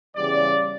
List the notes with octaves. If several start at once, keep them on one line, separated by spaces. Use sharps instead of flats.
E2 C#3 G3 D5